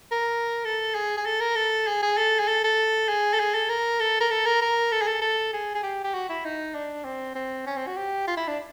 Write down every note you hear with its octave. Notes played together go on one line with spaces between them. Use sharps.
A#4
A4
G#4
G#4
A4
A#4
A4
G#4
G#4
A4
G#4
A4
A4
G#4
A4
G#4
A4
A#4
A4
A#4
A4
A#4
A#4
A4
G#4
A4
A4
G#4
G#4
G4
G4
F#4
E4
D#4
D4
C4
C4
C#4
C4
F#4
G4
F4
E4
D4